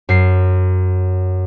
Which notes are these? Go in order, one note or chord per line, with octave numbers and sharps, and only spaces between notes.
F#2 C7